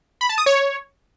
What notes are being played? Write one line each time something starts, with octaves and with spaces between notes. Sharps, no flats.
B5
A5
D#6
C#5